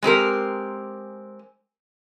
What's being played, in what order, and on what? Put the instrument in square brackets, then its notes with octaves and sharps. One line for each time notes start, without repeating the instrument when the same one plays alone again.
[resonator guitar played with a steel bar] G#3 C4 G4 A#4